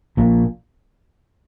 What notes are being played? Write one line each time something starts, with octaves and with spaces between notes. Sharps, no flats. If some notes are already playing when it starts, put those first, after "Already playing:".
A#1 A#2